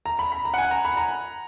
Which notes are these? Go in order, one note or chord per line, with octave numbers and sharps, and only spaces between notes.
A#5
B5
B5
A#5
F#5
G#5
A#5
B5
A#5